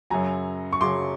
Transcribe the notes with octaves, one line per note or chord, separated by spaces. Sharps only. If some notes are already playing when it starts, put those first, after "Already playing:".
F#2 C#3 F#3 G#5 A#5
C#6
F#2 C#3 F#3 C6 D6